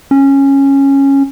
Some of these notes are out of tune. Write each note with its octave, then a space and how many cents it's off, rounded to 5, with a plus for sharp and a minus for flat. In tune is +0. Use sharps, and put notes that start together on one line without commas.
C#4 -10